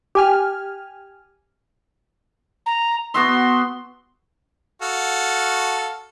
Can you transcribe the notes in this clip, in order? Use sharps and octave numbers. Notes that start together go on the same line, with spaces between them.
G4 G#5 F6
A#5
B3 F#4 E5 C6
F#4 A4 F5